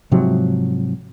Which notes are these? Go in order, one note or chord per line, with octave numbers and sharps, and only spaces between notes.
G#2 C3 F3 F#3